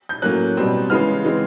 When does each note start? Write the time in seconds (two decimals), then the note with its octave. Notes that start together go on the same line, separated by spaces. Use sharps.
0.09 G6
0.22 A2 F#3 A#3 C#4 F#6
0.57 B2 G3 C4
0.90 C#3 E3 G#3 B3 F6
1.25 E3 G#3 C4